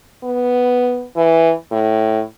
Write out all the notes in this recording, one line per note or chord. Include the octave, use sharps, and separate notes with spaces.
B3
E3
A2